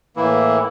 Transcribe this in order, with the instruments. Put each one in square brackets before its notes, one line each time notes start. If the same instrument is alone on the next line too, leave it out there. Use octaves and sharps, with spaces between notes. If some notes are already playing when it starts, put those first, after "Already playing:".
[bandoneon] A2 E3 A#3 E4